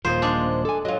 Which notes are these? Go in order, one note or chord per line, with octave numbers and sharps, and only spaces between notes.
D#1 A#2 F3 A#3 D#4 G#4 C5
G#3 D4
A4 G#5
F#3 F4 D#5